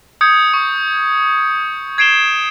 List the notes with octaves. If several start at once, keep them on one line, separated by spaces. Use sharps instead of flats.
D#6 G6 G#6 C#7
C#6
G#6 C7 D7 E7 G7